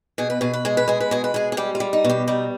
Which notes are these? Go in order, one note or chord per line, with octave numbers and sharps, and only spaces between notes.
B2 G#4
B4
B2 G#4
B4
G#3 G#4
B4
G#3 G#4
B4
B2 G#4
B4
G#3 G#4
G#4
G3 G4
F4
G3
D#4
B2
G4
G3 D#4